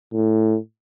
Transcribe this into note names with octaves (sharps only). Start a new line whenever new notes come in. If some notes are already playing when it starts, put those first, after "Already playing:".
A2